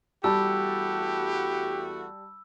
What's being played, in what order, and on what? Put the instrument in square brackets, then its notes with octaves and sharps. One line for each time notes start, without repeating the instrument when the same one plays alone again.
[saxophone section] E2 A3 F#4 [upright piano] G3 A5 [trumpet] G4 [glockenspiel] E6